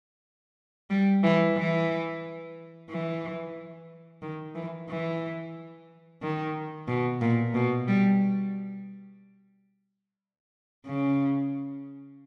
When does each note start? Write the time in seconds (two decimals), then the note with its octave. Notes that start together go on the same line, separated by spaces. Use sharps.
0.90 G3
1.24 E3
1.57 E3
2.90 E3
4.22 D#3
4.55 E3
4.89 E3
6.22 D#3
6.88 B2
7.21 A#2
7.55 B2
7.88 G3
10.87 C#3